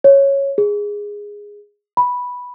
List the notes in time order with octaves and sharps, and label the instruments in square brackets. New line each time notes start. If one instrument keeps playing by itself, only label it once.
[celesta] C#5
G#4
B5